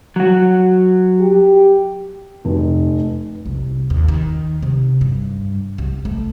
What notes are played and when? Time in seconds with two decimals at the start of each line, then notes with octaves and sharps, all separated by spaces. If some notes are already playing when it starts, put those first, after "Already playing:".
0.16 F#3 F#4
1.20 G4
2.45 F1
3.46 C2
3.90 D#2
4.08 D#3
4.62 C3
5.01 G2
5.78 C2
6.05 A3